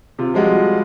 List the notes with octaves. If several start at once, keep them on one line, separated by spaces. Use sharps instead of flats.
C3 F4
F3 G3 G#3 F4 F#4